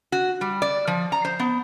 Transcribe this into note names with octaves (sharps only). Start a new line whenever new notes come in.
F#4
G3
D5
F3
A#5
C5
B3